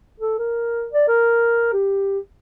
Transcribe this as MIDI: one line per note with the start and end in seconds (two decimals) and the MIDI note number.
0.20 0.36 69
0.39 0.86 70
0.92 1.04 74
1.08 1.68 70
1.73 2.19 67